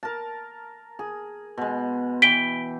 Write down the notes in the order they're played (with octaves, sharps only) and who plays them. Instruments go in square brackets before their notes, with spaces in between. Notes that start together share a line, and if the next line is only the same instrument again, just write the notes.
[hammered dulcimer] A#4 A5
G#4
B2 G#3
[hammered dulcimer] E3 G5 [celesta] B6 D7 G7